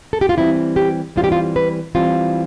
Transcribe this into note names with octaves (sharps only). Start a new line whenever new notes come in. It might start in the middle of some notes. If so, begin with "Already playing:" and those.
A4
G4
F4
E3 G3 C4 E4
G4
E3 G3 C4 F4
G4
F4
B4
E3 G3 C4 F4